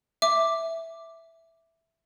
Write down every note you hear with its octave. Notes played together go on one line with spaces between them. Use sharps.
E5 D6